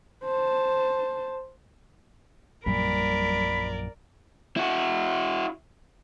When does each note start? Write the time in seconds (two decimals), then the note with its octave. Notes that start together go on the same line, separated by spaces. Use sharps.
0.24 C5 A5
2.66 A#1 F#2 A#2 F#3 G3 A#4 D5 B5
4.56 E4 F#4